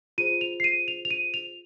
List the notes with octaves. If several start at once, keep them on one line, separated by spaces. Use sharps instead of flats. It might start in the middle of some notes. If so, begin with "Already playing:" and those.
F4 G#4 C5 D#7
F7
C7
D#7
F7
F7
D#7
F7